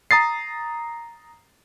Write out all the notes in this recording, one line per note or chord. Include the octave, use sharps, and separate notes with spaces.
A#5 D#6 A6 C7